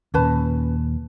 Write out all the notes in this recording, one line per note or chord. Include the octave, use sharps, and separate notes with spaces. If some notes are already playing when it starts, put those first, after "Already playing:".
D#2 A#2 C#4 B4 A5